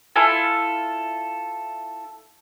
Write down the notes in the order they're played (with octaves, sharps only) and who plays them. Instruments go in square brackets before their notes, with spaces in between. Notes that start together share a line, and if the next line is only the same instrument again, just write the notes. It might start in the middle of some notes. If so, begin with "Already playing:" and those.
[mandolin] E4 F4 A4 G#5